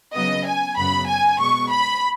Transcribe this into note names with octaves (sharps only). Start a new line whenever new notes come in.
C#3 F#3 B3 D#5
G#5
F#2 C#3 F#3 B3 B5
G#5
B2 G#3 B3 C#6
B5